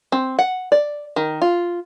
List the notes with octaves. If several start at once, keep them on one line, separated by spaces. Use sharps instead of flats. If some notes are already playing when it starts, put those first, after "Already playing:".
C4
F#5
D5
D#3
F4